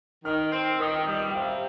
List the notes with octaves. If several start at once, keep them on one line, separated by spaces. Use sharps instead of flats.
D#3 F6
C4
D#3 D#6
G3 D#6
G5
C3 F5